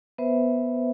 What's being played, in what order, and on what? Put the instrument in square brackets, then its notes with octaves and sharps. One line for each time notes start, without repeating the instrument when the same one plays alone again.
[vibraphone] B3 B4 C5 E5